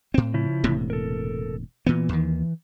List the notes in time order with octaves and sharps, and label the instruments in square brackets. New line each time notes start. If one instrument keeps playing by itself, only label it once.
[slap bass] A2 C4
[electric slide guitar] C#3 F3 E4
[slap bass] E1 A2 C3
[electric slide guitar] A4 A#4
[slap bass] A#2 B3 [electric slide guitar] E3
[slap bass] D#2 D#3